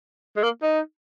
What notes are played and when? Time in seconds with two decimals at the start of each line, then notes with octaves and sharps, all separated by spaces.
0.37 G#3
0.43 A#3
0.62 D#4